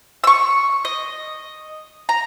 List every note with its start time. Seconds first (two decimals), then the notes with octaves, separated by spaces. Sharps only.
0.24 C#6 E6
0.85 D#5
2.09 A#5